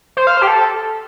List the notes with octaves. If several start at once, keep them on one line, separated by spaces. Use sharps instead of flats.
C5
F5
C5
G4
A4